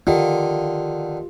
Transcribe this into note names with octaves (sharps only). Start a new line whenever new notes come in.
D3 D#3 F4 G4